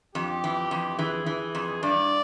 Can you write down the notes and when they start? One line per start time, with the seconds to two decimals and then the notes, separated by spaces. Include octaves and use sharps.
0.15 F2 G4
0.44 E3
0.71 F2
0.99 E3 G#4
1.26 E3
1.55 F2
1.83 G2 D5